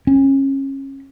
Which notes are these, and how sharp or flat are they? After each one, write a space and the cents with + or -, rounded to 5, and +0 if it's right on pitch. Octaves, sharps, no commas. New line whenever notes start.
C#4 -25